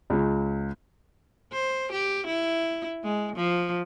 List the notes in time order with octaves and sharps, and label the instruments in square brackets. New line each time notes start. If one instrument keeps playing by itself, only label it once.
[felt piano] C#2
[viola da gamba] C5
G4
E4
G#3
F3